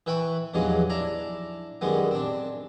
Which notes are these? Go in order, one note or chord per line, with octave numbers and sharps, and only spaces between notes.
E3 B4 E5 G5 B5 C#6
E2 G2 F3 F#3 G#3 D#4
D4 E4 A#5
F#2 D#3 G3 G#3 B3
C4 D4